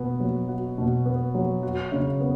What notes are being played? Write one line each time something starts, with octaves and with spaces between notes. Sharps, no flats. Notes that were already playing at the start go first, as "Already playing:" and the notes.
Already playing: B2 B3
F#3
F#4
B2
B3
F#3
F#4
C#3
B3